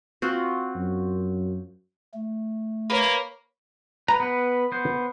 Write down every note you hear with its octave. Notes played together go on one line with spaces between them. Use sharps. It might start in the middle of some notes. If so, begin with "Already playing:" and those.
C4 F4 F#4
F#2
A3
A#3 B4 C#5
B4 A#5
B3 B4
B3 C5